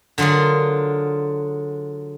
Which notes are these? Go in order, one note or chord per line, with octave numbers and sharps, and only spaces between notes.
D3 F#3 F4 G#4 A#4